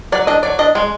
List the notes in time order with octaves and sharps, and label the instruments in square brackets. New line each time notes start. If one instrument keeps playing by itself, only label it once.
[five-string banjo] F#3 D5
D4 D#5
F#3 D5
D4 D#5
G#3